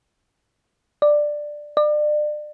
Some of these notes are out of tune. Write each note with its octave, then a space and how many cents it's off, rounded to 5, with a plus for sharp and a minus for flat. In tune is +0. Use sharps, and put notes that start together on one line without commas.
D5 +10
D5 +35